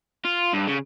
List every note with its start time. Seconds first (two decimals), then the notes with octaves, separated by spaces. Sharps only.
0.25 F4
0.54 G2
0.68 C#3